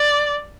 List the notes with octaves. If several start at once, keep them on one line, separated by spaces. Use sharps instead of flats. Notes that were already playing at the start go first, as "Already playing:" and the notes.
Already playing: D5